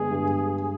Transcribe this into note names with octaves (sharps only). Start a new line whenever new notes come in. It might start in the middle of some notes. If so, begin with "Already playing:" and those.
Already playing: G2 D3 G#3 B3 G#4
G2